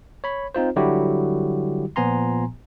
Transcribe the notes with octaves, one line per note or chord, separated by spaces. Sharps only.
C#5 B5
C4 D#4 F4 C5
D3 F#3 G3 E4 F#4 G4
A#2 F3 B3 G#5 A#5 C6